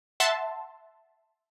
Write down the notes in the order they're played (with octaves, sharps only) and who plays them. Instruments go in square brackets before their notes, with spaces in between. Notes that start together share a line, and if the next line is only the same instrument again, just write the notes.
[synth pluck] E5 F#5 A5 C6